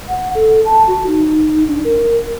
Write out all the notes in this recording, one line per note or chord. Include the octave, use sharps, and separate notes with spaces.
F#5
A4
A5
F#4
D#4
D4
A#4